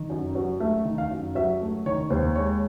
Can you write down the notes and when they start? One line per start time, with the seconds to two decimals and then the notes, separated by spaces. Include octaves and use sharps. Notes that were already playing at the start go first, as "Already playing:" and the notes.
Already playing: D#3
0.10 F#2
0.35 F#3
0.60 A3 E5
0.85 D#3
0.98 F5
1.11 F#2
1.35 F#3 E5
1.61 A3
1.86 D#3 C#5
2.10 D#2 C5
2.35 G#3 C#5